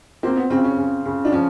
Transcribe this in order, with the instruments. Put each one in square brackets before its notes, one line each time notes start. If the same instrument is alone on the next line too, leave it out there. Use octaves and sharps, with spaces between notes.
[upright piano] A#3 [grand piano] C4
[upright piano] B3
[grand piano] C#3 [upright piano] C4
[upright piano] C#4
[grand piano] C#3
C#3
[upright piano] D4
[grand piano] F3 [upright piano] C#4